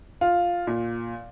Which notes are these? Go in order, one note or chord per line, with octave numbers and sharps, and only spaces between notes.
F4
A#2